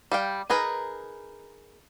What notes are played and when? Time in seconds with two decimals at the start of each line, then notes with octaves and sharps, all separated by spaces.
0.12 G3 F5 G5
0.50 D#4 G#4 A#4 B4